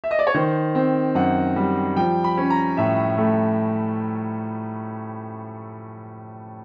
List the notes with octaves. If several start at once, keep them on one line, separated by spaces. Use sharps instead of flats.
E5
D#5
D5
C#5
D#3 C5
C4
F#2 F#5
G3
F3 G5
B5
C#4
A#5
A2 E5
A3